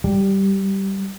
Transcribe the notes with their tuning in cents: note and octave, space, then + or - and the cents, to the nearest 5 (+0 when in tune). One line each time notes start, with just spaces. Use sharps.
G3 -10